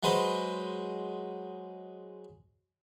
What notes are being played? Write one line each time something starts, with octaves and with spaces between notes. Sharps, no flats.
F#3 G#3 B4 C5 B5